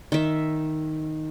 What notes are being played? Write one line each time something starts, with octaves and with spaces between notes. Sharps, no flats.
D#3 E5